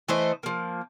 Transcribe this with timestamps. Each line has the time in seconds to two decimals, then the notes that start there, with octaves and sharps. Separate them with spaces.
0.08 E3 A3 C5 D#5
0.43 F3 A#3